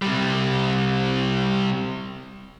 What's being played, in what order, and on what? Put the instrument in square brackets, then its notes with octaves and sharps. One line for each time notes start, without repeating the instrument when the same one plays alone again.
[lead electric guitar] C3 G3